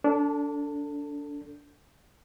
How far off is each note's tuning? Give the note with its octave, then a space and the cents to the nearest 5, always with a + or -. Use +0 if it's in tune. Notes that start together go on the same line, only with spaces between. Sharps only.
D4 -25 A4 +20